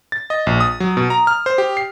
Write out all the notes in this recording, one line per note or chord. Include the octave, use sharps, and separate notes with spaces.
A6
D#5
A#1
D#6
F#3
B2
A#5
F6
C5
G4
C7